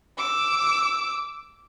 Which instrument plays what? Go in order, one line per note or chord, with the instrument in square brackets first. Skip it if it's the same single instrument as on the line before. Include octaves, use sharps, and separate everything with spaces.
[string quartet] D6 E6